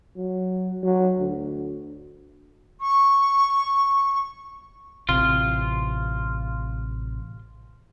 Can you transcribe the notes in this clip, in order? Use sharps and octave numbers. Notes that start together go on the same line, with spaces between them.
F#3
F#3
D2
C#6
A1 C3 C4 F4